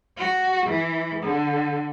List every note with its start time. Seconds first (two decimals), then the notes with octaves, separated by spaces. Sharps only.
0.17 F#4
0.66 E3
1.23 D3